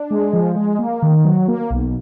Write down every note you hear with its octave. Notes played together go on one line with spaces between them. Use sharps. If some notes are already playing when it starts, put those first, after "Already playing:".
Already playing: D4
G#3
F3
G#3
A#3
D#3
F#3
A#3
B1